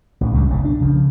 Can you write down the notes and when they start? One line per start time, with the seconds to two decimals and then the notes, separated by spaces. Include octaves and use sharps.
0.21 A1
0.34 C#2 F#2 G3
0.50 F#1 B1 A2
0.65 D4
0.81 C#3 F3